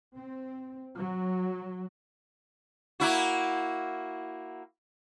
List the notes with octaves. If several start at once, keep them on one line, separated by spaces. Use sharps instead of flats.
C4
F#3
A#3 E4 F#4